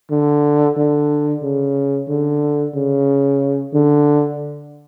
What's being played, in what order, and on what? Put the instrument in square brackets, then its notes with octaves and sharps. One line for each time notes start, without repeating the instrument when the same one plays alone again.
[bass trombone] D3
D3
C#3
D3
C#3
D3